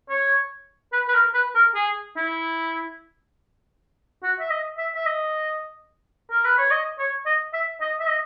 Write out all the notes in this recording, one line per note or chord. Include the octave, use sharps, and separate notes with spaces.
C#5
B4
B4
A#4
B4
A#4
G#4
E4
F#4
E5
D#5
E5
E5
D#5
A#4
B4
C#5
D#5
C#5
D#5
E5
D#5
E5
D#5